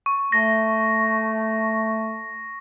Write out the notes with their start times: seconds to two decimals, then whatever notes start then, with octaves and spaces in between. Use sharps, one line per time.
0.06 C#6
0.32 A3 A#6